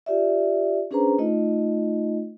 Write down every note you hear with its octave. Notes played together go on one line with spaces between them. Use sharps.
F4 G4 D5 E5
C#4 D4 G#4 B4 C5 A#5
A3 D#4 F4 D#5